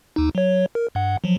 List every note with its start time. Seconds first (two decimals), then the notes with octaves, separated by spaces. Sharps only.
0.16 D#2 D#4
0.35 F#3 C#5
0.75 A#4
0.95 G2 F#5
1.24 F3 F#3